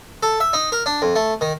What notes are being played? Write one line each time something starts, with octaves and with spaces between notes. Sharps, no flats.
A4
E5
D#4
A#4
D4
F2
A3
D#3